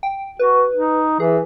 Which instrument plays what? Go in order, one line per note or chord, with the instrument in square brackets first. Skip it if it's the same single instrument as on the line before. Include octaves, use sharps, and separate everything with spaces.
[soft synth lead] G5
[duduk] F#4 [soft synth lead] B4
[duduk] D#4
[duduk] E3 [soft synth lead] G#4